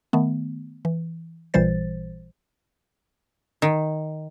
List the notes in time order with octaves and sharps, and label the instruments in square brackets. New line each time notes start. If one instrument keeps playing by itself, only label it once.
[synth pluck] D#3 A3 B3
E3
A1 A#2 E3 G3 C5 A6
[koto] D#3